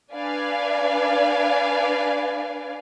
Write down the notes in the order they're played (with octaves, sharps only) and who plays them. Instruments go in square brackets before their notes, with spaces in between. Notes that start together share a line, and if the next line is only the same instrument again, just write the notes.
[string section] D4 B4 D5 F5 G#5